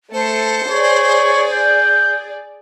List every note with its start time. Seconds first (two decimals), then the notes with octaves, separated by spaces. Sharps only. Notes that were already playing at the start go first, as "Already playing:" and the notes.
0.14 A3 C5 A5 C#7
0.70 G#4 C#5 D5
1.53 G6